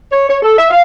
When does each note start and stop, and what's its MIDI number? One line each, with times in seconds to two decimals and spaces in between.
0.11 0.27 73
0.28 0.37 73
0.42 0.54 69
0.57 0.67 76
0.69 0.81 77